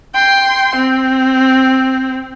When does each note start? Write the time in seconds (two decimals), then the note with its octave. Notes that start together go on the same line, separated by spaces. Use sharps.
0.14 G5 C6
0.75 C4